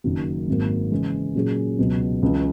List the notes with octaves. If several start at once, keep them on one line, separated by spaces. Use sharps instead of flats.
F#1 F#2 D#3 F#3
G#1 G#2 F#3 A#3
C#3 E3 G#3
A#2 F#3 C#4 G#4
C#2 B2 F#3
C#2 C#3 E3